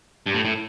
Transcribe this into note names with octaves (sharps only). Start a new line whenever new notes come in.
G2
A2
A2